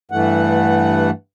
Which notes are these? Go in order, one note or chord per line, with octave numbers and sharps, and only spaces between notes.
G2 E3 A3 F#5